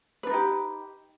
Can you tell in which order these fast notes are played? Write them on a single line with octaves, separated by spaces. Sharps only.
B4 D4 D#4 G4